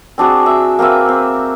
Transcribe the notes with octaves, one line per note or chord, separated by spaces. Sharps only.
C4 D4 F#4 G#4
E5
A#3 C4 B4 E5
C4